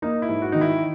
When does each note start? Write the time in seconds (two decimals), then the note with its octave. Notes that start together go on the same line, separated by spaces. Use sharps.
0.02 A#3 D#4
0.22 E4
0.29 G#2
0.42 F#4
0.52 D#3 D#4
0.61 E4